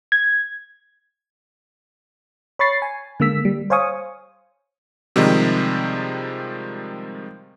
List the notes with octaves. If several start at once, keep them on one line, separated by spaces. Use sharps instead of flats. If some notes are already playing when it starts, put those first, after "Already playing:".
G#6
C#5 B5 C#6 A6 C7
G#5
D3 G#3 A#3 E6 B6
G3
C5 C#5 F5 G#5 C#6 D#6
C3 D#3 F3 G3 G#3